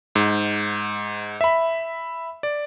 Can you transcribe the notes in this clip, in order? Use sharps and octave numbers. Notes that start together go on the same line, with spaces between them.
G#2
E5 B5
D5